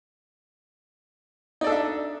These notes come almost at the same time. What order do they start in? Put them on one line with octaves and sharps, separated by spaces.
D#4 D5 A4 D4 E5